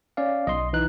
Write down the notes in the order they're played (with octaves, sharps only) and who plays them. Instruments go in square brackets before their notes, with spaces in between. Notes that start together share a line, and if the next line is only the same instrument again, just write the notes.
[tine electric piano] C#4 D5 F5
[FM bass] B1 [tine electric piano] D#5 C6
[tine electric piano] E3 D#4 F#6